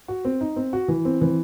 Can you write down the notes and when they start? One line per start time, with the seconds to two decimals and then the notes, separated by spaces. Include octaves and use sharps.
0.08 F#4
0.25 C4
0.41 D#4
0.56 C4
0.73 F#4
0.88 E3
1.05 C4
1.21 E3